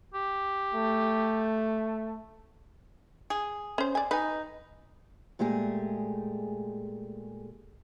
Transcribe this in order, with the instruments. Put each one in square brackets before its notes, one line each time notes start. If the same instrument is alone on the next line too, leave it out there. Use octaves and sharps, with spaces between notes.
[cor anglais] G4
[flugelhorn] A3
[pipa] G#4
[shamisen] C#4 C5
D5 G#5
[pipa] D#4 [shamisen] B4 G#5
[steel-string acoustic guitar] A#2 G#3 A3 G4 G#4